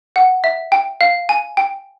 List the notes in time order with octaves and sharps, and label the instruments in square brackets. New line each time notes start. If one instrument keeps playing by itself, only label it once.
[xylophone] F#5
E5
G5
F5
G#5
G5